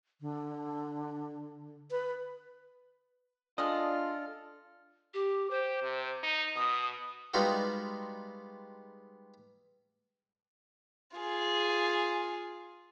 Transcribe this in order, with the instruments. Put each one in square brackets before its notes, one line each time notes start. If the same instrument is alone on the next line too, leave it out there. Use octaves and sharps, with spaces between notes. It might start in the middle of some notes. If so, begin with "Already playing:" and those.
[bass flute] D3
B4
[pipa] G#3 D#5 [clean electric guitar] D4 [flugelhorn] F4 [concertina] A4 F6
[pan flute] G4
[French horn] G4 [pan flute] C5
[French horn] C3
D#4
[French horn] B2 [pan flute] D#6
[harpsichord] G3 G#3 B3 D#4 F4 F#4
[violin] F4 G#4